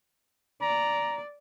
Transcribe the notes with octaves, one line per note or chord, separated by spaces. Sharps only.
D5 A#5